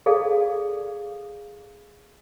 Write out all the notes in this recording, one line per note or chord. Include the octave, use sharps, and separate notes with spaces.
G#4 A4 D5 F5